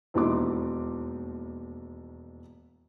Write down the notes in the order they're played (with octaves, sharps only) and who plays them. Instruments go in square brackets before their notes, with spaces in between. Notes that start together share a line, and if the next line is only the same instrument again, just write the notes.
[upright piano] E1 D#2 D#4 E4 C6 D6